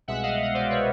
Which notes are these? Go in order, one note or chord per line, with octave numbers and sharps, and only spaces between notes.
C2 B2 G#3 E5 F#5
D#5 F5
D#5
C5 D5
B4 C#5